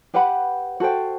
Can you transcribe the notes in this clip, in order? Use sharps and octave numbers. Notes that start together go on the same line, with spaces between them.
G4 B4 F#5 B5
F#4 A4 C5 G5